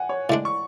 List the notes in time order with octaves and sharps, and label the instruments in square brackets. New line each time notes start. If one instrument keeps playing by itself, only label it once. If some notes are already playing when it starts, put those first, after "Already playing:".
Already playing: [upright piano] F#5 G#5
C#5
[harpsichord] A2 G#3 D4 [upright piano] D5
[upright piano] C#6